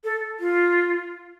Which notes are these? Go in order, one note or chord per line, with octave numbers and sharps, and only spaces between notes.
A4
F4